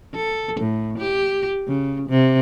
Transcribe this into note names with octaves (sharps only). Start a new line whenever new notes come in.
A4
A2
G4
C#3
C3